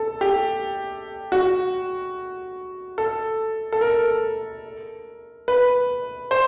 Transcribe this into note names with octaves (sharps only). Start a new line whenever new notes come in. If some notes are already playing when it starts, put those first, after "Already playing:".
Already playing: A4
G4
F#4
A4
A4
A#4
B4
C5